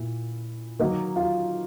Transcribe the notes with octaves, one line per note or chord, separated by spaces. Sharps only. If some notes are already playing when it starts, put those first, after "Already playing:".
Already playing: A#2 E4
D#3 F#3 A#3 D#4 D#5
F4 F5